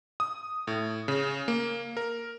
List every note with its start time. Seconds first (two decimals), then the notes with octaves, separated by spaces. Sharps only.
0.20 D#6
0.67 A2
1.08 C#3
1.48 A#3
1.97 A#4